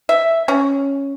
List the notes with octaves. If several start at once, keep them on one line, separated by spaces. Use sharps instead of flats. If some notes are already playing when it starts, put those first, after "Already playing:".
E5
C#4